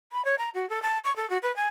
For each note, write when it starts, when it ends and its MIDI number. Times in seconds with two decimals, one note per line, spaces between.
0.12 0.24 83
0.25 0.35 73
0.38 0.50 82
0.54 0.68 66
0.69 0.82 69
0.82 0.98 81
1.04 1.15 85
1.16 1.29 69
1.30 1.38 66
1.42 1.54 71
1.56 1.67 80